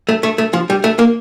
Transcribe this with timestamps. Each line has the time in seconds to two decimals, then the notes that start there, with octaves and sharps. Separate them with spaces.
0.09 A3
0.23 A3
0.38 A3
0.53 F3
0.70 G3
0.84 A3
0.99 A#3